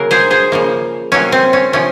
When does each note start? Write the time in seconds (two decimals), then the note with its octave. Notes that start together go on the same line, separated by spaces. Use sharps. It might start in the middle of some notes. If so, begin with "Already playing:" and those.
Already playing: C#3 F#3 A#3 A#4
0.11 G#4 C5
0.31 G#4 C5
0.52 C#3 F3 A#3
1.12 C3 F#3 A#3 C#4
1.32 C4
1.53 C#4
1.73 C3 F3 C#4